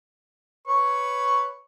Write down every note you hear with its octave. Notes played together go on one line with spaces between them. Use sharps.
B4 C#5 C#6